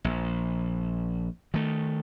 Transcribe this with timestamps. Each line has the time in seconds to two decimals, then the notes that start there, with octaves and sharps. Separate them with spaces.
0.04 A#1
1.54 D#3 A3